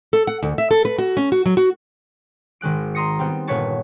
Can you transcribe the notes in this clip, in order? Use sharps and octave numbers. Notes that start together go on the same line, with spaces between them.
A4
F#5
D2
E5
A4
B4
F#4
C#4
F#4
F#3
F#4
G#1 D#3 G#3 F#6 D7
D#5 A#5 C6 D#6 A#6 C#7
G3 B3 C4
G1 A#2 B3 B4 C#5 A5